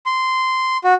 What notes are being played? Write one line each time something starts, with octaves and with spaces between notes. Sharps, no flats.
C6
F#4